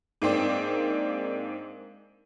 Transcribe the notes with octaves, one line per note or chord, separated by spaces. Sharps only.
G#2 A#3 C4 D4